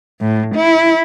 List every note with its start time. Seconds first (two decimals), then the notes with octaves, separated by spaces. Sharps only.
0.20 A2
0.55 E4